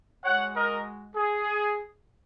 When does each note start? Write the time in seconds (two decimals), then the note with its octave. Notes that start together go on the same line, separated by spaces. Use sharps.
0.24 G#3 F#4 C#5 F#5
0.54 A#4 D#5
1.15 G#4